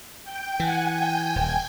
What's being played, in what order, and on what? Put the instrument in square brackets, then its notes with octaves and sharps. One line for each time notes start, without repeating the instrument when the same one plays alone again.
[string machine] G5
[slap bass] E3 [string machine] F#5 G#5
[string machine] G5 G#5
[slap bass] D#1